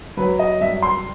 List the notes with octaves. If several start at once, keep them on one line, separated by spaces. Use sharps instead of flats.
F#3 B4
D#5
G2 E5
C6